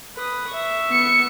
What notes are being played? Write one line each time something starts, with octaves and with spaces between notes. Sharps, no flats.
B4 D#6
E5 C#6
B3 C#7